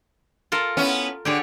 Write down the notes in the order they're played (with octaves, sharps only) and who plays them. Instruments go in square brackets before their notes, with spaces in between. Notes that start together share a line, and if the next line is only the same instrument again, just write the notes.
[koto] F4 A4 A#4
[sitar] B3 C#4 E4
[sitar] D3 [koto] G4 G#4 C#5